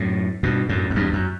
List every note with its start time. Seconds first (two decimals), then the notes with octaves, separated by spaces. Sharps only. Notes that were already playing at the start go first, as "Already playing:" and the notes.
Already playing: F#2 A2
0.43 G2 B2
0.69 F#2 A2
0.90 F#2
0.95 E2 G2
1.13 F#2